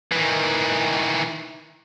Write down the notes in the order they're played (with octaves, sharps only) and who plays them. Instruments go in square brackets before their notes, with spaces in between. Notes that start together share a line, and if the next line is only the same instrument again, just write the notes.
[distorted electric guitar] D#3 E3